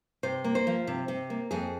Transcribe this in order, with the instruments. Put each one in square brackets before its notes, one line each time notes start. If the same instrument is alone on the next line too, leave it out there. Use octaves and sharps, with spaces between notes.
[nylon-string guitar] C3 C5
A#3
C5
F3
C3
C3
A#3
F2 G#4